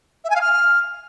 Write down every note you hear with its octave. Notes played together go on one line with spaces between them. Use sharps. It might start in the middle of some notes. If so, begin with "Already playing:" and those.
E5
G#5
F5
F6